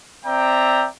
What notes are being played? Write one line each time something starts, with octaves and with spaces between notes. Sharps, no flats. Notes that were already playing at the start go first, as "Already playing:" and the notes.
C4 D5 E5 G5 A#5